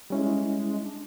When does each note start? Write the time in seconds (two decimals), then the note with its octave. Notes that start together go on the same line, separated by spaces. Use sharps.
0.10 G3 G#3 C#4 E4
0.83 D4